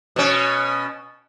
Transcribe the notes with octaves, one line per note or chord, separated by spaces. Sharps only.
B2 C#4